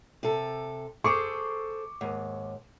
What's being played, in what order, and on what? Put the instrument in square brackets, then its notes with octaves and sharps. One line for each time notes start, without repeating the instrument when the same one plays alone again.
[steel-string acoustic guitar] C3 A4
[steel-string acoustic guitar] G#4 A4 C5 [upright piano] C#6 D6 C#7
[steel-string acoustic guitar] D#2 G#2